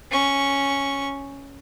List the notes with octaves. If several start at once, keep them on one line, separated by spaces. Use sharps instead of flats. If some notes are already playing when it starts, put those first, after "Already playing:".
C#4 C#6